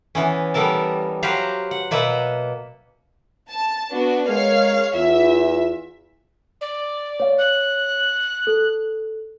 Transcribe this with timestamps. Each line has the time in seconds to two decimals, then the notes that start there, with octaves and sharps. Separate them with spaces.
0.15 E3 B3 C#4
0.54 G3 B3 A4 A#4 A5
1.23 F#3 G4 B4 C5 F5 A#5
1.71 F#5
1.91 B2 A#3 B4 E5 F#5
3.48 A5
3.91 B3 D4 F#4
4.27 G#3 A#4 C#5 F5
4.95 E2 F4 E5
6.61 D5
7.20 C#5 F5
7.38 F#6
8.47 A4